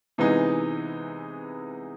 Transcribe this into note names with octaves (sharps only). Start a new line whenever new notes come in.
C3 E3 G#3 B3 D#4